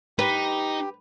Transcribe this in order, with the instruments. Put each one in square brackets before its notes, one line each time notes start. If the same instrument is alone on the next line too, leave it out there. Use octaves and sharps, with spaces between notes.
[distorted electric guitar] D#4 [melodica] G4 [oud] B4